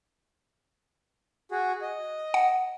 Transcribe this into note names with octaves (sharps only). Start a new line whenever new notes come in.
F#4 G#4
D#5
F#5